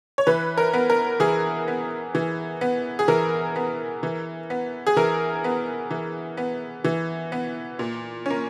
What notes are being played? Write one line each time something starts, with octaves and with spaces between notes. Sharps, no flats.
C#5
E3 B4
A#4
B3
A#4
E3 G#4
B3
E3
B3
G#4
E3 A#4
B3
E3
B3
G#4
E3 A#4
B3
E3
B3
E3
B3
A#2
A#3 C#4